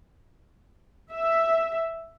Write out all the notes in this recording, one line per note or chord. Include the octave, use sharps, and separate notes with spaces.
E5